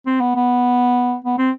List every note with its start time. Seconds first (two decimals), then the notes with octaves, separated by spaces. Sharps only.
0.06 C4
0.21 B3
0.35 B3
1.25 B3
1.38 C4